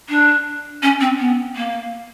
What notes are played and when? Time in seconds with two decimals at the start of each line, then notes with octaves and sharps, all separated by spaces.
0.09 D4
0.83 C#4
1.01 C4
1.19 B3
1.56 A#3